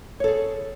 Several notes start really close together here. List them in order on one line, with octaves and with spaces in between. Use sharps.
C#5 A4 G#4